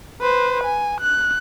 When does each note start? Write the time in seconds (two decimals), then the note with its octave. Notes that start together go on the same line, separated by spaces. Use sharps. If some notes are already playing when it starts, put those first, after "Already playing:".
0.22 B4 C5
0.64 G#5
1.01 F#6